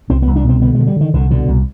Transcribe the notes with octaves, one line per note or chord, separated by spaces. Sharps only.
C2 C4
C2 B3
D4
B2 C4
D3 B3
D3 G#3
G3
D3 D#3
C2 D3
B2 D3
C2